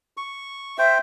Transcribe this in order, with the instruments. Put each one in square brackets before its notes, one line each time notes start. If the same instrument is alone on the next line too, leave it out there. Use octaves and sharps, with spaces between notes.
[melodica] C#6
[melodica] C5 G5 [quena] E5